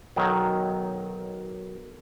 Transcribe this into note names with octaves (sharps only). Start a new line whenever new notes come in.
B1 D#3 F#3